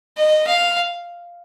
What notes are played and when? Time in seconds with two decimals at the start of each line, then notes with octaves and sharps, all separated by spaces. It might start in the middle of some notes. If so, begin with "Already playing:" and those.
0.17 D#5
0.47 F5